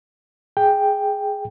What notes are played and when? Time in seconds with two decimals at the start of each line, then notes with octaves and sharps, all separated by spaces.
0.57 G#4 G5